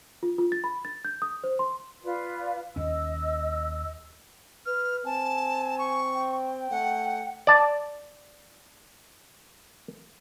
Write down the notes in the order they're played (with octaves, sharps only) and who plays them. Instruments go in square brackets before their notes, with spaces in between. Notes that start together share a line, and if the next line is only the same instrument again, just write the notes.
[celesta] F4
F4
A6
B5
A6
G6
D#6
C5
C6
[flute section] F4 B4 D5
[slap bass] D#2 C#4 [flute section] D#5 E6
[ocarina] B4 [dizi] F6
[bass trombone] C4 [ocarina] G#5 [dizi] A5
[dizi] C#6
[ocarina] G5
[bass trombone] A3 [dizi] F#5
[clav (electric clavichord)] D5 A5